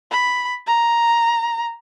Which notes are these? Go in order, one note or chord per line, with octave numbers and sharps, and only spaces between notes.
B5
A#5